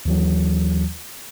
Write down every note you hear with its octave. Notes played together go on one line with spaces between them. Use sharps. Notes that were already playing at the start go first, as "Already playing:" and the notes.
D#2 E3 F#3